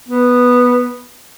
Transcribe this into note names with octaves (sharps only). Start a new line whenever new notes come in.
B3